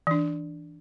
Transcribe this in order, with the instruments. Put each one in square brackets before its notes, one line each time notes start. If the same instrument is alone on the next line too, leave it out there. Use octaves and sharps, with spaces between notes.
[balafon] E3 D4